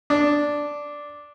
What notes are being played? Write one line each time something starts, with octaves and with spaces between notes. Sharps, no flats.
D4